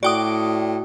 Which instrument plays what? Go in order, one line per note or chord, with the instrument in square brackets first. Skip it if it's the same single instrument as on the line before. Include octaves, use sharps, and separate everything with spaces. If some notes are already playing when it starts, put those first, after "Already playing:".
[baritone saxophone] A2 [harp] F#4 F#5 D6 [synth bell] D5 G5 D#6